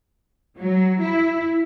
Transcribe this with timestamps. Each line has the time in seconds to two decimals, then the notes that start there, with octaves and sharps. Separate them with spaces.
0.57 F#3
1.01 E4